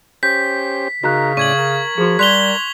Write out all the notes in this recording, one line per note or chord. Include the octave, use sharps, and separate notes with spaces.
C#4 G4 C5 G6 B6
C#3 D#4 F#4 A#4 A#5 F#6
A2 C#4 D5 C#6 G#6 D#7 F#7
A#4
F3 F#4 G#4
G3 C6 F#6 G#6 B6 F7 G7